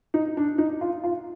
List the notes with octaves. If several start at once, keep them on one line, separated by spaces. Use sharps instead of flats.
D#4
D4
D#4
F4
F4